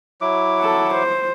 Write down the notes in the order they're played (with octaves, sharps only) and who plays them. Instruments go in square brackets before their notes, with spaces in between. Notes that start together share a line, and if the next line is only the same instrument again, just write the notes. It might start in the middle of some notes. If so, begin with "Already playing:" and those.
[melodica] F#3 E4 D6
[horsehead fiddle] A4 F#5
C5